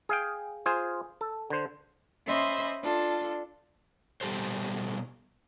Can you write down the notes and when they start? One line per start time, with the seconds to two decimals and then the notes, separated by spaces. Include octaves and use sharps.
0.09 G#4 F5 G5
0.66 F4 G#4 C5
1.21 A4
1.50 D3 C5
2.26 C#4 C5 D#5 E5 B5 C6
2.82 D4 F4 A4 A5
4.21 B2 G3 G4 A4 C5